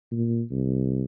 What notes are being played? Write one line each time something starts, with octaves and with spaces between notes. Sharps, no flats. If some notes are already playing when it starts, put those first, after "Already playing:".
A#2
C2